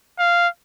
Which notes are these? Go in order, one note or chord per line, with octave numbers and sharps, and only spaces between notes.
F5